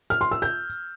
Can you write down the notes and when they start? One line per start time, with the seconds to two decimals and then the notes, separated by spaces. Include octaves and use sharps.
0.10 F6
0.21 C6
0.31 E6
0.42 G6